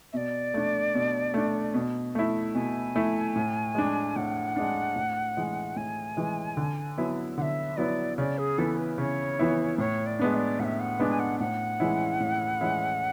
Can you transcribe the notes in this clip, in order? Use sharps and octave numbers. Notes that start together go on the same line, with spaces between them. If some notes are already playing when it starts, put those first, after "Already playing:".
B2 D5 E5
A3 D4
B2
A3 D4
B2
A3 E4
B2 G#5
A3 E4
A2
G#3 D4
A2 F#5
G#3 D4
A2
E3 G#3
A2 G#5
E3 G#3
D3
F#3 B3 E4
D3 E5 F#5
F#3 B3 E4 D5
C#3 D5
G#4
E3 B3 E4 A4
B4
C#3 C#5
E3 B3 E4
A2 C#5
D5
G#3 B3 D4
E5
D5
A2 E5 F#5
F#5
G#3 B3 D4
G#5
F#5
A2 F#5
E3 G#3 C#4 E4
A2
E3 G#3 C#4 E4